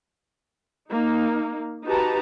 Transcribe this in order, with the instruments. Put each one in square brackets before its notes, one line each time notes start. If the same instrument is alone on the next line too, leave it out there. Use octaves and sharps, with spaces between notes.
[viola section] A#3 D#4
D#4 F#4 G4 B4 A5 A#5